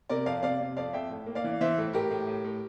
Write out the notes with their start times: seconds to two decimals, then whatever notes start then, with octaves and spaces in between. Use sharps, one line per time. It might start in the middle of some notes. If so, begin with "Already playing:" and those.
0.09 C3 A#4 D5
0.26 F2 D5 F5
0.43 C3 D5 F5
0.60 C3
0.77 F2 D5 F5
0.93 F2 E5 G5
1.10 A2
1.26 A#3
1.35 D5 F5
1.44 E3
1.61 E3 C5 E5
1.78 A2
1.93 A2 G4 A#4
2.11 A2
2.27 A2
2.44 A2